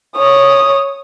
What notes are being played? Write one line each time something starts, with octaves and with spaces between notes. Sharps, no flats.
C#5 D#6